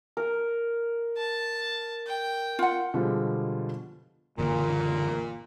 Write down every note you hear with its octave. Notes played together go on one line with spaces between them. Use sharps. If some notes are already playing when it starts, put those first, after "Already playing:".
A#4
A5
G5
F4 F#5
B2 D3 F3 G3 G#3 F4
F#1 A#2 D3 E3